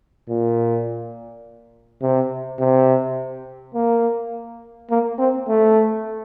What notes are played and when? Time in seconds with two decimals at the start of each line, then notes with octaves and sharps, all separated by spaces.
0.29 A#2
2.02 C3
2.60 C3
3.74 A#3
4.91 A#3
5.19 C4
5.48 A3